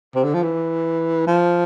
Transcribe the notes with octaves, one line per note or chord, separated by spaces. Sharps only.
C3
D3
F3
E3
F3